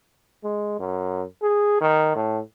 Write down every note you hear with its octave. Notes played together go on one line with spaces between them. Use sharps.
G#3
F#2
G#4
D#3
A2